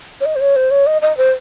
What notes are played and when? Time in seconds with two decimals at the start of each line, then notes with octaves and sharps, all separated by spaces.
0.21 C#5
0.26 D#5
0.36 C5
0.41 C#5
0.56 C5
0.71 C#5
0.87 D#5
1.02 D#5
1.17 C5